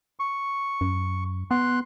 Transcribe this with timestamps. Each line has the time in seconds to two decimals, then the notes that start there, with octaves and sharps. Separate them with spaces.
0.20 C#6
0.81 F#2
1.51 B3 C6 F#6